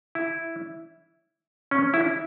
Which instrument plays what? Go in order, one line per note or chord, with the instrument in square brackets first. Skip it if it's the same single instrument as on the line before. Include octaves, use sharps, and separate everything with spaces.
[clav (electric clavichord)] E4
C#4
E4